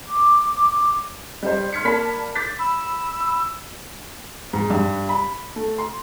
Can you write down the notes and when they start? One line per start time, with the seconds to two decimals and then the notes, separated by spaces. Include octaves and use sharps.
0.08 D6
1.43 G3 C5
1.73 C6 F6 G#6 B6 C#7
1.85 A#3 D5 A5 B5 B6
2.35 D6 G6 A6 B6 C7
2.59 B5 E6
4.53 G#2
4.70 G2
5.09 B5
5.56 A3
5.78 C6